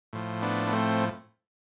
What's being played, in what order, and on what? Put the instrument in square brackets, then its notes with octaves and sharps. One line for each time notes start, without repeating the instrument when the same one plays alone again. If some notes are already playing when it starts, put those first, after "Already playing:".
[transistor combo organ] A2 F3
B3 D4
B3
A3 C4